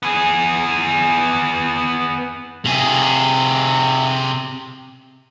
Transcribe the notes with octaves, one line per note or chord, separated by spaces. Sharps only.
B3 G#4
C3 G#4